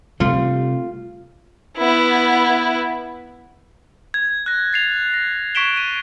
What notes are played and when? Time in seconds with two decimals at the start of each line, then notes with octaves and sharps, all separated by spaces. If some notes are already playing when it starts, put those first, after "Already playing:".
0.20 C3 G3 A3 F4
1.77 B3 E4
4.14 G#6
4.46 F#6 A#6
4.73 A6 C7 F7
5.14 A#6
5.55 C#6 G#6 B6 D7 E7 G7
5.77 D#7